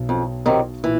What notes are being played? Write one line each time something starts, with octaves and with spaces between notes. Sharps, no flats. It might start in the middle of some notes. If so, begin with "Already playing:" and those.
Already playing: B1 B2
F2
C3 D#3 F#3
A#2 E3